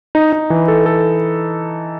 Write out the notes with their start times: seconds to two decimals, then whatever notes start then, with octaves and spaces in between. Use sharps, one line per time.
0.15 D#4
0.33 D#4
0.50 E3
0.68 A4
0.86 A4